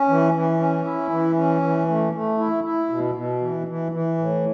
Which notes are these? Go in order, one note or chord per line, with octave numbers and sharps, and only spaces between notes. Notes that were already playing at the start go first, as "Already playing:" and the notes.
Already playing: C#4
E3
E3
C#4
E4
E3
C#4
E3
A3
A3
E4
E4
B2
B2
E3
E3
E3
A2